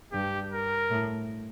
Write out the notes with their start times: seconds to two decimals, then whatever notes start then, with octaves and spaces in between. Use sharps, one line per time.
0.13 G2 G4
0.52 A#4
0.91 A2